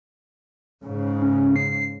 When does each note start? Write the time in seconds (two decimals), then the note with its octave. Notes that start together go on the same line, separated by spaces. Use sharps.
0.83 G#2 C#3
1.22 C#4
1.56 C7